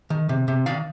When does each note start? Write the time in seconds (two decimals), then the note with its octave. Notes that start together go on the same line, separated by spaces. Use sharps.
0.10 D#3
0.29 C3
0.48 C3
0.66 D#3 D5 F5